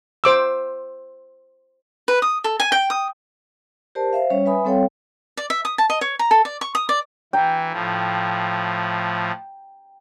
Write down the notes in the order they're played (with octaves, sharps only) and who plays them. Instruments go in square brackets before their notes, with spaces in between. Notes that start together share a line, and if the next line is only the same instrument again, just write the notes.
[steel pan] C5 D6 E6
[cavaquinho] B4
D#6
A4
G#5
G5
D#6
[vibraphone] G4 A#4 C5 D5 A5
C5 E5 F5
G3 C#4 C#5
B4 E5 G#5 B5 D#6
G3 C4 A4 C#5 F5 G5
[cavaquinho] D5
E5
D#6
A5
D#5
C#5
A#5
A4
D5
C#6
D#6
D5
[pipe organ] E3 [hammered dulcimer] G5 A#5
[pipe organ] A2 F3